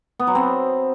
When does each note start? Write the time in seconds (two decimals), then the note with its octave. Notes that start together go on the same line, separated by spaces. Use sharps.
0.19 B3
0.27 F#3
0.35 C4